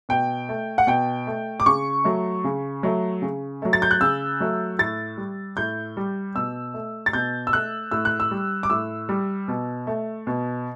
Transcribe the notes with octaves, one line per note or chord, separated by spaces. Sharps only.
B2 G5
A3
F#5
B2 G5
A3
D6
C#3 C#6
F#3 A3
C#3
F#3 A3
C#3
F#3 A3
A6
G6
F#6
C#3 E6
F#3 A3
A2 A6
G3
A2 G6
G3
B2 E6
A3
A6
B2 G6
E6
A3 F#6
A2 E6
F#6
E6
G3
D6
A2 E6
G3
B2
A3
B2